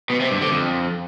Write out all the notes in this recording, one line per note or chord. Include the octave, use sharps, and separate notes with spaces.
B2
C3
G2
D3
F2